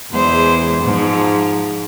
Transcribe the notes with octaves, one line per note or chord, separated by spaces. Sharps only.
E2 G#3 C5
G#2 F3